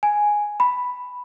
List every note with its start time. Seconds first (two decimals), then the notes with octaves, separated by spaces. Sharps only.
0.03 G#5
0.60 B5